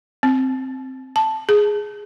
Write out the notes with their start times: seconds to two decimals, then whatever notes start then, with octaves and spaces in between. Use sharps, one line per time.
0.23 C4
1.16 A5
1.49 G#4